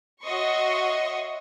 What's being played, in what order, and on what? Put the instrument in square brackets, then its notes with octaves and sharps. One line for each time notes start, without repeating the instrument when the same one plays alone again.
[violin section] F#4 C#5 D#5 E5 C6 C#6